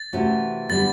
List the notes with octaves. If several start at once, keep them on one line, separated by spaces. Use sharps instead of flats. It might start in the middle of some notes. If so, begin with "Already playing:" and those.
Already playing: A6
C3 E3 A3 C#4 F#4
D3 G3 B3 A6